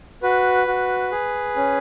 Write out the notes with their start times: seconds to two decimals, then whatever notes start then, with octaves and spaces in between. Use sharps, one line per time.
0.23 F#4 B4
0.67 F#4
1.12 G#4
1.56 C#4